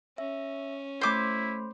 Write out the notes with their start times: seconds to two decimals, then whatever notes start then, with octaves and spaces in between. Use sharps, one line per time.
0.18 C#4 E5
1.01 A3 E4 C5 B5 C6 D6